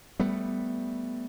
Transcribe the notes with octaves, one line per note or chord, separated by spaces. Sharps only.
G3 A3 B3